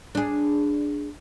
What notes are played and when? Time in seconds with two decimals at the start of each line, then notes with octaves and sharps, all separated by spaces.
0.15 D4 G#4